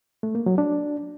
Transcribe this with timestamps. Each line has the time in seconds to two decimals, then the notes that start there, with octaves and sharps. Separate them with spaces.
0.23 A3
0.35 A#3
0.46 F#3
0.58 D4